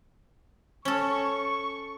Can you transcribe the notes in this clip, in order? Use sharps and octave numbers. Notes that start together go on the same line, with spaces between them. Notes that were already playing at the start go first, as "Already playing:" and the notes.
C#4 A4 C#6